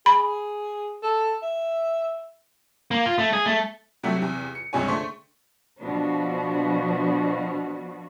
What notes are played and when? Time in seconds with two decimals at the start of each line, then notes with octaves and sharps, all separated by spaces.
0.06 G#4 B5
1.03 A4
1.43 E5
2.91 A#3
3.06 F4
3.18 A3
3.33 G#4
3.46 A3
4.03 C3 F#3 G3 A3 F#4 G4
4.22 E2 C3
4.55 C#7
4.73 C#2 G2 C3 C#5 G#5
4.88 D3 A3 C5 C6 C#6
5.80 B2 F3 B3 D4 F#4